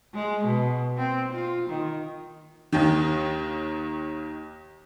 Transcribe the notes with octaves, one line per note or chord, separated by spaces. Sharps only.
G#3
B2
C4
F4
D#3
D#2 D#3